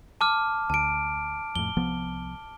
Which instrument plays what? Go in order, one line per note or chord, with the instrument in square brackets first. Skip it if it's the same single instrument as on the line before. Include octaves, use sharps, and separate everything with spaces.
[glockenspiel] A5 D6 F6
[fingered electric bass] D2 [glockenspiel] A5 D7
[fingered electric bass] F2 A2 [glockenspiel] G7
[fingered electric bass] C2 F3 B3